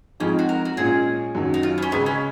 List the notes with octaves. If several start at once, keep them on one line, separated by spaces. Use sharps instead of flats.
F2 F3 G#3 C#4 D#4
F#4
A#4
F#4
A#2 G#3 C#4 F4 G#4
F#2 D#3 F#3
D#4
F4
B3
C#4
C#2 C#3 G#3 B3
C#4